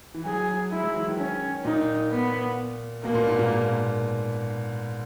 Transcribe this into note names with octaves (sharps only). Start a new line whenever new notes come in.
E3
F#3 G#4
G#3 E4
F#3
E3
D#3
C#4
A#2 D#4
B3
B2 A#3
A#2
G#2
A#2